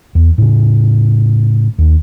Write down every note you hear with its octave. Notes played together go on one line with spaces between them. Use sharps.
E2
A2 C#3
D#2